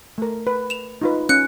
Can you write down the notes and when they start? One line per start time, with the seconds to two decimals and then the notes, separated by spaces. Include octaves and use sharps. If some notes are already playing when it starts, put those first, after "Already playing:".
0.18 A3 A#4
0.47 B4
0.70 E7 F7
1.02 D#4 F4 B4
1.29 C#4 F#6 C#7